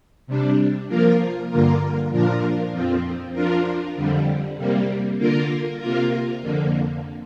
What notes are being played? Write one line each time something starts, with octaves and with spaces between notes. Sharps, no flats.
C3 G3 D4
F3 A#3 F4 A#4
G2 D3 A#3 F4 A#4
A#2 F3 D4 F4 A#4
F2 F3 C4
F3 D4 F4 A#4
F2 D3 G3
C3 G3 A#3
D3 A#3 F4 A#4
C3 A#3 F4 A#4
F2 D3 A#3